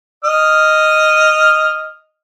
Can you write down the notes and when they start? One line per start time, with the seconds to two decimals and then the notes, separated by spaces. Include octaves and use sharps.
0.24 D#5 F6